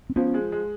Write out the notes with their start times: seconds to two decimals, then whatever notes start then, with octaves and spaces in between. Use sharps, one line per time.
0.10 C4
0.16 F3 B3 C#4
0.34 G#3
0.52 G#3